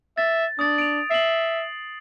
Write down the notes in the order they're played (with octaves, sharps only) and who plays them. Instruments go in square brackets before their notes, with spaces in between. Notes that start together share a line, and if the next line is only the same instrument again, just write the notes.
[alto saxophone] E5 [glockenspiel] A6
[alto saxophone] D4 [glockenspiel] D#6 A6
[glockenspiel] D7 F7
[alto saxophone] E5 [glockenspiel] C7 F#7